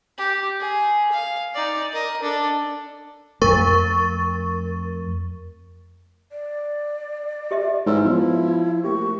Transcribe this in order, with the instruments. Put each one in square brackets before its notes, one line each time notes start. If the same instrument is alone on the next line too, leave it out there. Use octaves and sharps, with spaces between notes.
[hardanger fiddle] G4
G#4
F5
D#4 D5
A#4 D#5
D4 A4
[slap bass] F2 A3 [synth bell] A#4 C#6 A6
[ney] D5
[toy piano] G4 D#5 E5
[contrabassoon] G#2 [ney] E4 [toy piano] B4 C#5 E6
[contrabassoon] F3 [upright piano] B3
[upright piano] A3 A#3 G4 [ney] C#6